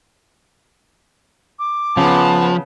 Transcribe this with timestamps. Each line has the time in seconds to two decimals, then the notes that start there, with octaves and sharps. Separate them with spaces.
1.59 D6
1.97 C#3 F3 B3 A5